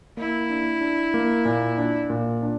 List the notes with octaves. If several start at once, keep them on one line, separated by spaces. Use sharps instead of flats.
A#3 E4
D4
D4
A#3
A#2
D4
A#2
D4